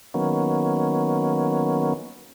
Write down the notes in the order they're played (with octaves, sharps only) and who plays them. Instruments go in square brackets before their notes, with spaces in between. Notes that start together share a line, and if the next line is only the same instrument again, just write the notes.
[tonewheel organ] D#3 F#3 A#3 B3 C#4